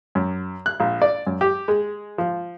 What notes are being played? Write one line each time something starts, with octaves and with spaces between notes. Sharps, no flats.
F#2
F#6
A#1
D5
F#2
G4
G#3
F3